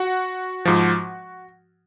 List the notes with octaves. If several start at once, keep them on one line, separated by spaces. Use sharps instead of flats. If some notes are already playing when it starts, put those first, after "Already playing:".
Already playing: F#4 F#5
G#2 F3